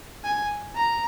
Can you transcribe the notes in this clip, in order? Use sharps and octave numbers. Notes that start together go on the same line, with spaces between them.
G#5
A#5